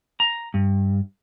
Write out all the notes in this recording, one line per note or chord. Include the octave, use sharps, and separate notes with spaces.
A#5
G2